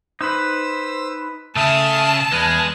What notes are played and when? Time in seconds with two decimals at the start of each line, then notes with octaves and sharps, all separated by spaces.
0.21 D#4 B4 C5 E6
1.56 C#3 A3 E5 A5 D#6 F6
2.32 E2 G#3 G#4 B4 G#5 F6